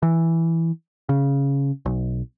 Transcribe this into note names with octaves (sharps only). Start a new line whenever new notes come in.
E3
C#3
B1